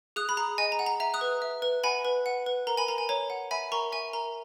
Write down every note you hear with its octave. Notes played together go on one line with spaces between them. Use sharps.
G#4 D#6 F#6
B5
G#4 A#5
D#5 G#5
A#5
F#5
A#5
E5 A#5
D#6 F#6
B4
E5
B4
F#5 G#5 B5
B4
F#5
B4
A#4 A#5
G#5 B5
A#4 A#5
G#5
C#5 A#5
F#5
E5 G#5 B5
A#4 A#5 C#6
E5 G#5
A#4 A#5